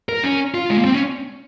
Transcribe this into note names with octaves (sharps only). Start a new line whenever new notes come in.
A#4
C#4
F4
G#3
A#3
C4
C#4